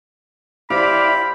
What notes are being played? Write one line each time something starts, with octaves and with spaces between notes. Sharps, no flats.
E4 G4 C5 D5 F5 B5